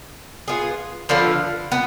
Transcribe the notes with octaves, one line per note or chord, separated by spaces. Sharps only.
B3 F4 G#4
D3 F3 B3 F4
B3